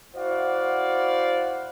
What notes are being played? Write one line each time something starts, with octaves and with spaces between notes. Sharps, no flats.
E4 F#4 C5 D5 F5 F#5